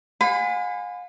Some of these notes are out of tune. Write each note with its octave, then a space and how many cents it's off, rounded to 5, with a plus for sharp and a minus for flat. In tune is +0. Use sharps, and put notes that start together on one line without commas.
F5 +45 G#5 -25 B5 +30